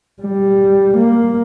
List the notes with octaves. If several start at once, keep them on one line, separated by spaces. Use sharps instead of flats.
G3
A#3